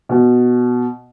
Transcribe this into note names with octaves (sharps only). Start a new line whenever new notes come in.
B2